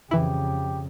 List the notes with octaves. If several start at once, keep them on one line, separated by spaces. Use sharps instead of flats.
F2 C#3 E3 E4 G4